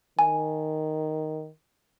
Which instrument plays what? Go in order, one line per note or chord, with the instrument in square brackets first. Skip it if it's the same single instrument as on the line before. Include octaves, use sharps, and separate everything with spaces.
[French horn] D#3 [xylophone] G#5